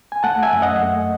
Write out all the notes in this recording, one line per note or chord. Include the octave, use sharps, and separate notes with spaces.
G#5
A3 F#5 A5
E5 G#5
F#2
D#5 F#5
A3